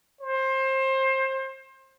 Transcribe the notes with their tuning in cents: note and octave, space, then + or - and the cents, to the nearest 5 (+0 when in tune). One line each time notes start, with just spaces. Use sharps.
C5 +25